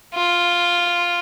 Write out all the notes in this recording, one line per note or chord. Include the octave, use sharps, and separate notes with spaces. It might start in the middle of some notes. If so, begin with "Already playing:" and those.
F4